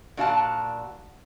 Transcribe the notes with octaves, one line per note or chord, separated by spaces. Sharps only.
A#2 D4 F#4 F5 G#5 A5